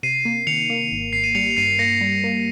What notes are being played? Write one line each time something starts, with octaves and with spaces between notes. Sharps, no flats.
C3 C7 D#7
A#3
D#3 C#7 F7
A#3
G#1
G#1 C7
D#7
G3 C#7 F7
F7
G2 C7 D#7
A#3 A#6 C#7
G3
A#3